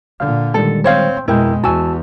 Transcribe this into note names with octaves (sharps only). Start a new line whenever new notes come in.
A#2 D3 F5 F6
D#3 G3 G#3 A4
C4 C5 C#5 F5
F2 B2 G#3 E4 A#4 G5 G6
E2 F#4 G#5 A5 E6